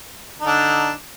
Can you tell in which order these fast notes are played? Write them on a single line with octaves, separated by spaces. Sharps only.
D#4 D3 D4